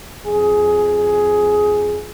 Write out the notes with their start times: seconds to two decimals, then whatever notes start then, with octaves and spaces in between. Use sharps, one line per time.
0.24 F2 G#4